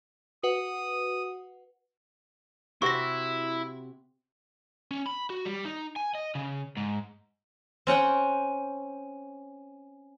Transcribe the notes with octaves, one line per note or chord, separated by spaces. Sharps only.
F#4 B4 F#5 D#6
C3 E4 F#4 C5 C#6 A#6
C#4
B5
F#4
G3
D#4
G#5
D#5
C#3
G#2
C4 C#4 F#5 G5